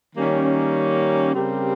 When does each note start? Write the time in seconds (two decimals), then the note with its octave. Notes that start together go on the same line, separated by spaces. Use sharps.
0.15 D#3 G3 A#3 C#4
1.34 C#3 G3 C4 G4 A#4